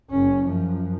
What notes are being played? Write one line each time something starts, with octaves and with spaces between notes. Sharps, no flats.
F#1 C#4
F#2 F3